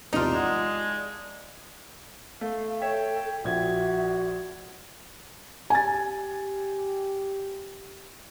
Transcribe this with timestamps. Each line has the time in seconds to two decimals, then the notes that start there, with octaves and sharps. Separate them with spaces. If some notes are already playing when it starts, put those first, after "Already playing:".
0.13 B1 E2 C3 A#3 D4 D#4 F4
0.34 G#3 F#5 D#6
2.41 A3 F5
2.82 A4 C#5 E5 G5
3.44 A#1 F3 F#4 E5 G#6
5.70 G4 G#5 A6